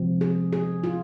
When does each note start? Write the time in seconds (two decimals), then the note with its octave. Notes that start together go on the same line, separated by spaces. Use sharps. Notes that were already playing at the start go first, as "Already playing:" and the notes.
Already playing: C3 F3 G#3 C4
0.21 G#4
0.53 G#4
0.84 F4